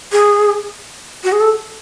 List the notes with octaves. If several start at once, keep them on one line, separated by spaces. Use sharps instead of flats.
G#4
F#4
G#4
A4